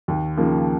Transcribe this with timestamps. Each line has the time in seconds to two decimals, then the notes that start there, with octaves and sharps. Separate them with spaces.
0.08 D#2
0.37 C#3 F3 A#3 D#4